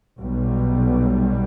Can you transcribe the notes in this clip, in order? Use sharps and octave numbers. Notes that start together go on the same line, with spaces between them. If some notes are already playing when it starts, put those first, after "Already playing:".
B1 B2 G3